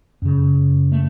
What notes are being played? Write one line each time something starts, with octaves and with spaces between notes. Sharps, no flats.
F#2 C#3
A3